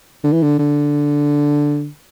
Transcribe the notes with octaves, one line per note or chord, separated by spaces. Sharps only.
D3
E3
D3
D3